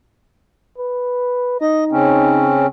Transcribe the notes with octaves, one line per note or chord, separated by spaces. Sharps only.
B4
D#4 D#5
C#3 C4 C#4